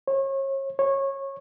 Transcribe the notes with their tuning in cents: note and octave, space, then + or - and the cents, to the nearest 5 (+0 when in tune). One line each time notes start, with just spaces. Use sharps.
C#5 -35
C#5 -20